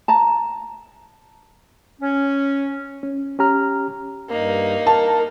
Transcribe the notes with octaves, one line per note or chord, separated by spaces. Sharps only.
A5 A#5
C#4
C#4
C#4 G4 A#5 F6
G2 A#3 D#4
A#4 A5